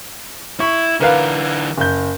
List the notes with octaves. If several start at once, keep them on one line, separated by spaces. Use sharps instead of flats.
E4 C#6
D3 E3 A#4 B4 F5
F#1 G6